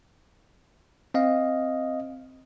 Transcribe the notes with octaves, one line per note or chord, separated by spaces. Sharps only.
C4 D#5 F5